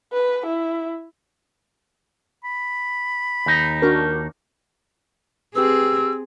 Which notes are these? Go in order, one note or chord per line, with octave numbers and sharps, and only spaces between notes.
B4
E4
B5
D#2 D#4
D4 F#4 A#4
C4 G4 G#4 B4 E6